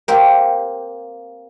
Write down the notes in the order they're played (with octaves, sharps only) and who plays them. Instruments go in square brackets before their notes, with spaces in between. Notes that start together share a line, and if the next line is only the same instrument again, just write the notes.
[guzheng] A#3 C4 G4